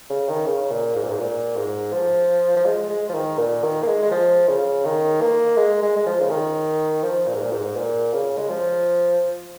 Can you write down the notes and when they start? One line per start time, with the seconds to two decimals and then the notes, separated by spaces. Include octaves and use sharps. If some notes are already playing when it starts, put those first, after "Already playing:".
0.10 C#3
0.29 D#3
0.46 C#3
0.71 A#2
0.95 G#2
1.03 A#2
1.10 G#2
1.19 A#2
1.56 G#2
1.93 F3
2.57 F3
2.66 G#3
2.90 G#3
3.10 F3
3.14 D#3
3.38 A#2
3.64 D#3
3.83 A#3
3.87 G#3
4.02 G#3
4.11 F3
4.48 C#3
4.85 D#3
5.21 A#3
5.57 G#3
5.82 G#3
5.96 G#3
6.07 F3
6.21 C#3
6.30 D#3
7.03 F3
7.27 A#2
7.34 G#2
7.42 A#2
7.52 G#2
7.76 A#2
8.13 C#3
8.38 G#3
8.49 F3